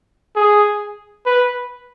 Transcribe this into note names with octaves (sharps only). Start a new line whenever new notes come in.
G#4
B4